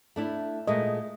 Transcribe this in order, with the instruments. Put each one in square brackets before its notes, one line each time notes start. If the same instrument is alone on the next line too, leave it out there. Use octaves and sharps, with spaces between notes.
[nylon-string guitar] A3 D4 E4
[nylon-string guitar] A#2 G#3 A3 [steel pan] D#5